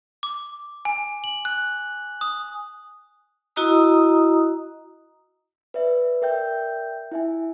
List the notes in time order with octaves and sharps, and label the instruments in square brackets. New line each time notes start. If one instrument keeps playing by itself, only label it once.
[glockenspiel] D6
G#5
F#7
F#6
D#6
[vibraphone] E4 F#4 D#5 A#5 D#6
[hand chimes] B4 D5 E5
A#4 D5 E5 G5 G6
E4 E5 G#5